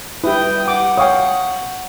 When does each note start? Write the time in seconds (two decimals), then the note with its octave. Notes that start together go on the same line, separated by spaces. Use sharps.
0.24 G3 E4 B4 G5 D#6
0.68 F#5 D6
0.97 C#5 F5 G5 C#6 D#6